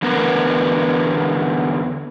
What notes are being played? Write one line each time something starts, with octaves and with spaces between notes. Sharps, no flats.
E2 D3 B3 A#4 B4